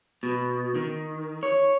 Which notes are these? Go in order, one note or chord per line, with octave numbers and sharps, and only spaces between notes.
B2
D#3
C#5